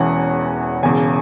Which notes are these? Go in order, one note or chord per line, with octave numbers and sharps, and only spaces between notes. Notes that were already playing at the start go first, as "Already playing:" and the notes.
Already playing: E1 E2 E3 C#4 F#5
E1 E2 C#3 G#5